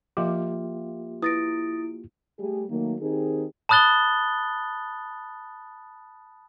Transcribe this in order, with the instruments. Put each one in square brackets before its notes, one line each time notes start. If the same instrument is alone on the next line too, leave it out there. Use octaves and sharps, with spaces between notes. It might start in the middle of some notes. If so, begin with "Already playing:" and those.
[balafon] F3 [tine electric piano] A#3 F4 G4 [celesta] E5
[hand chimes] E4 D7 [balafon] B4 [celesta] D#6 A6 A#6
[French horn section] G3 A3 G#4
D#3 F#3 A3 A#3
D#3 C4 D#4 G4 G#4
[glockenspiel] A5 B5 D#6 F#6 A6 G7